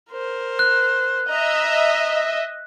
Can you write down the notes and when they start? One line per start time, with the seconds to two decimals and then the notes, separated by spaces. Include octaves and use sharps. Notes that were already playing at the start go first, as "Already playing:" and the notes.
0.11 A#4 C5
0.59 F#6
1.30 D#5 E5 A#5